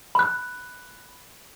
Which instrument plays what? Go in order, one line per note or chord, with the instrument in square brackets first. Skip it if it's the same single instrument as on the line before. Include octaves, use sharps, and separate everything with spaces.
[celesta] B5 F#6